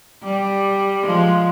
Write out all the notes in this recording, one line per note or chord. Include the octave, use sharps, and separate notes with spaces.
G3
F3 G#3